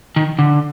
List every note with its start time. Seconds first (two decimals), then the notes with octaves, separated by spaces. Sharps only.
0.16 D#3
0.39 D3